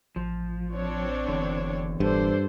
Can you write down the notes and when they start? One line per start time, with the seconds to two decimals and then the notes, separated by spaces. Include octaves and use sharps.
0.16 A1 F3
0.74 C4 D4 C#5
1.28 F#1 E2 D3
2.00 E1 G2 D4 A4 C5